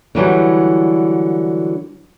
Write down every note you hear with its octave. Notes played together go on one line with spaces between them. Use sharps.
D3 E3 F#3 G3